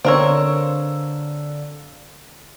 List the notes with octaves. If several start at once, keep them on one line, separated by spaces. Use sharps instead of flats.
D3 C4 A#4 C#5 F5 E6